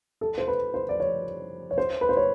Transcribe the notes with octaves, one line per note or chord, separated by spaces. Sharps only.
A4
C5
B4
C5
D5
C#5
C#5
C5
B4
C5
C#5